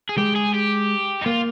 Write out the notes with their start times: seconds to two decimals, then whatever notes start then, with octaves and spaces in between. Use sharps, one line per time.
0.09 G#4
0.17 G#3 G4
0.36 G#4
0.54 G4
1.22 D#4
1.26 A#3 F4